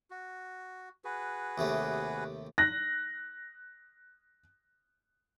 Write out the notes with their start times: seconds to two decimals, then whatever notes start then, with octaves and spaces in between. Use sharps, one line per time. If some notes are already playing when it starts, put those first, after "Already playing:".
0.10 F#4
1.04 F#4 G#4 B4
1.58 D#2 C3 A3
2.58 F#6 A#6